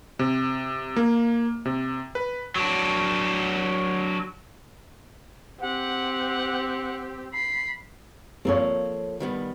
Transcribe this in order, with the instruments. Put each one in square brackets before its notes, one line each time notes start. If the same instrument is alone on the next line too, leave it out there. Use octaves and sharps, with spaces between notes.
[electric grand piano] C3
A#3
C3
B4
[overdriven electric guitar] F#3 D4
[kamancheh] C4 G4 [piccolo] F#5
[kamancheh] B5 [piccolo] C7
[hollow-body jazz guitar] F3 A#3 C4 [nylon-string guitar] A4 C#5
[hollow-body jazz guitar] D#3 G3 B3